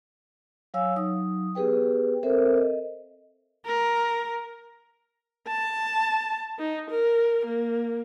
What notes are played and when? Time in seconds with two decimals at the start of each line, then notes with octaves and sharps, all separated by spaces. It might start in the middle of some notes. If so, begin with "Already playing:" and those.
0.74 F#3 C#5 F5 G#5 E6
0.96 F#3 D#4 D#6
1.55 B3 G4 G#4 B4 G5
2.23 C4 A4 A#4 C5 E5
2.57 D#5
3.66 A#4
5.47 A5
6.59 D#4
6.90 A#4
7.45 A#3